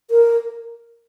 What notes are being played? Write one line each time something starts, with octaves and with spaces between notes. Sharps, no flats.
A#4